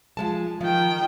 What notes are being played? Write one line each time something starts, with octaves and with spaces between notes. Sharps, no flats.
F3 G#3 A5
D#3 F3 G5